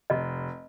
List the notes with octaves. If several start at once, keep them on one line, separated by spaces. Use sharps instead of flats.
F1 D#5